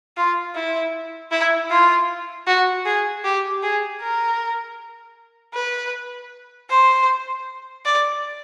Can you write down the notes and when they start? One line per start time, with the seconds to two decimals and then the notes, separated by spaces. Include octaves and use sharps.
0.17 F4
0.55 E4
1.31 E4
1.70 F4
2.47 F#4
2.85 G#4
3.24 G4
3.63 G#4
4.02 A#4
5.54 B4
6.70 C5
7.85 D5